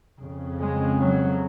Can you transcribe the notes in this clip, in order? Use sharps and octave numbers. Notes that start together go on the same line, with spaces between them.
F2 C#3
G#3
F#3